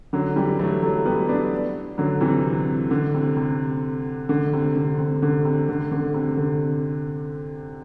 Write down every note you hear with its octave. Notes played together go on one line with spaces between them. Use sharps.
D3 F#3
E3 G3
F#3 A3
F#3 A3
G3 B3
B3 D4
D3 F#3
C3 E3
D3
C3
C3
D3
C3
D3
C3
D3
C3
D3
D3
C3
D3